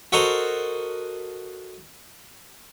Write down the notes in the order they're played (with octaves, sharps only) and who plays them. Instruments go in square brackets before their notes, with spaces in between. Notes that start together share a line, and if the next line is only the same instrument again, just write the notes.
[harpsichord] F#4 A4 A#4 C5 D#5